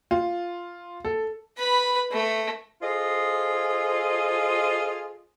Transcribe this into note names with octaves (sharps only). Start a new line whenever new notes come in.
F4
A4
B4 B5
A3
F4 G#4 A4 C5 D#5